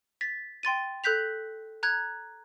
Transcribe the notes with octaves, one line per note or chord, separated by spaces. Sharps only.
A6 B6
G5 C6 A6 D#7
A4 F#6 G6 B6 F7
A#5 F#6 G#6